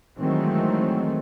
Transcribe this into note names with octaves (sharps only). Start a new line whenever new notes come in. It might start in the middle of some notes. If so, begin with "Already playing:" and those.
D#3 E3 F#3 G#3 A3 C4